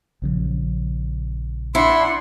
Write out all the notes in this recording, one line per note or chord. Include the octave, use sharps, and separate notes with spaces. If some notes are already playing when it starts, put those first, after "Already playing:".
A#1 C#3 F3
D4 E4 F#5 C6